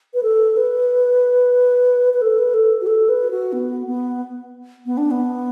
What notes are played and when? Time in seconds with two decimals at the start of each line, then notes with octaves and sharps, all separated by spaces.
0.14 B4
0.23 A4
0.57 B4
2.14 B4
2.21 A4
2.38 B4
2.54 A4
2.81 F#4
2.87 A4
3.09 B4
3.31 F#4
3.53 B3
3.87 B3
4.86 B3
4.97 D4
5.11 B3